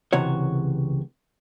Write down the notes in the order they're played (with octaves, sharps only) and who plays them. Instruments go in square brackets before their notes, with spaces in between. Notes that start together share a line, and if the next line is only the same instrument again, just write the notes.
[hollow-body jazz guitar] C#2 C3 E3 F#4 C#5